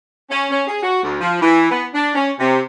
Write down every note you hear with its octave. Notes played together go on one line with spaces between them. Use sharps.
C#4
C#4
G#4
F#4
D2
F3
E3
B3
D4
C#4
C3